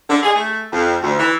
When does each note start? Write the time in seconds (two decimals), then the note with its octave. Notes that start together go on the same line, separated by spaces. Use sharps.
0.09 D3
0.22 G#4
0.34 A3
0.72 F2
1.02 D2
1.18 E3